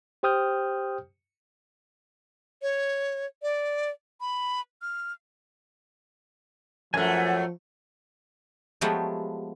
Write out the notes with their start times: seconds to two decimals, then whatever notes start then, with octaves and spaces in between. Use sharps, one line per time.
0.23 G4 C5 G5 D#6 F6 G6
2.62 C#5
3.42 D5
4.21 B5
4.82 F6
6.94 F#2 F3 A3 F#5 G#5
8.81 F3 F#3 G#3 A3 B3 G4